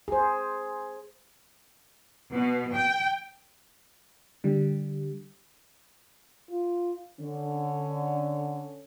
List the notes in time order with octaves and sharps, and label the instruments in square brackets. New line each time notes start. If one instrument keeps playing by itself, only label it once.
[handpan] G#4 C5
[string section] B2
G5
[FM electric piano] D3 G3
[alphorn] F4
[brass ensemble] D3 [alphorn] C#4